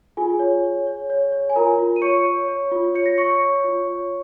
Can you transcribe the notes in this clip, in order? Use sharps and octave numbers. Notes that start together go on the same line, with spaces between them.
F4 G#4 G#5
C#5
C#5
C#5
C#5
C#5
G#5
F4 A#4 A#5
F4
D#7
C#5 C#6 C#7
C#5
C#5
F4
C#5 C#7
A#6
C#5 C#6 C#7
C#5
F4
C#5